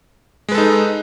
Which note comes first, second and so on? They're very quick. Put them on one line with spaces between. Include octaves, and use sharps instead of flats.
G#3 B4 A4 D#4